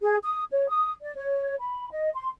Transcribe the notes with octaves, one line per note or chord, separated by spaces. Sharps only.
G#4
D#6
C#5
D#6
D5
C#5
B5
D#5
C6